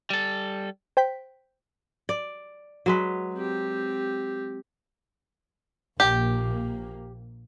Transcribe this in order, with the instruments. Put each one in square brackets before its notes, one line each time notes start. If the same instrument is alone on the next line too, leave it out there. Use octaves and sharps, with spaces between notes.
[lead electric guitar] G3 A4
[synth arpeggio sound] C5 G5 G6 B6
[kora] D5
F#3 G#3 B4
[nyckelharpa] C4 G4
[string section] A#1 A#3 [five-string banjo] G4